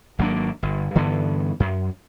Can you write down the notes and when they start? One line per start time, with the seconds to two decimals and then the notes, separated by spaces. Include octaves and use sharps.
0.19 G#1 F#3 A#3 D4
0.63 G1
0.95 G2 D3 E3 B3
1.60 F#2